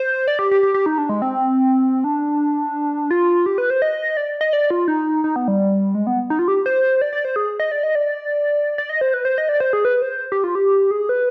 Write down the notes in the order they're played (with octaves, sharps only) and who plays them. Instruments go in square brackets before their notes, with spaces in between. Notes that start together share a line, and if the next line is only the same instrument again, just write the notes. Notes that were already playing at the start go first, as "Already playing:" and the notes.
Already playing: [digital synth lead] C5
D5
G4
G4
G4
G4
D#4
D4
G#3
C4
D4
F4
G4
B4
C5
D#5
D5
D#5
D5
F4
D#4
D#4
B3
G3
G#3
B3
D#4
F4
G4
C5
D5
D5
C5
G#4
D#5
D5
D#5
D5
D5
D#5
C5
B4
C5
D#5
D5
C5
G#4
B4
C5
G4
F4
G4
G#4
B4